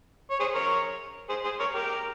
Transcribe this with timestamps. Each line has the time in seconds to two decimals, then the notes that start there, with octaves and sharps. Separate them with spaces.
0.31 C#5
0.40 G#4 C5
0.55 A#4 C#5
1.29 G#4 C5
1.44 G#4 C5
1.60 A#4 C#5
1.74 G4 A#4